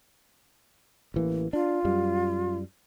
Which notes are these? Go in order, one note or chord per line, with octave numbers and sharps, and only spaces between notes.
A1 E3 A#3
D4 F4
F#2 G3